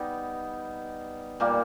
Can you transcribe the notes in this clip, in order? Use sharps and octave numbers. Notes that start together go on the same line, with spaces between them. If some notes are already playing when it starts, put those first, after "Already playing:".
Already playing: G3 B3 D#4
A#2 G3 A#3